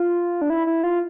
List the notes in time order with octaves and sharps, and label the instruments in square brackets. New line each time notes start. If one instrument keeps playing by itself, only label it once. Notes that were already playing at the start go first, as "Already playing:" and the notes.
Already playing: [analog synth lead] F4
D4
E4
E4
F4